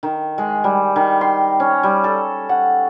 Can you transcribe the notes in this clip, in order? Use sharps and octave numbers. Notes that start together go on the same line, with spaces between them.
D#3
G#3
G3
D#3
C6
C#4
G3
A4
F#5